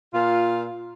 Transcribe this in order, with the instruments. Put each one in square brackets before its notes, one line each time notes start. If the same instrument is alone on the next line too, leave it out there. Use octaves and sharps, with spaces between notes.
[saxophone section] A#2 F4